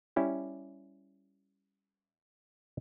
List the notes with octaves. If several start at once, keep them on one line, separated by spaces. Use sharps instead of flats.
G3 C#4 E4 G4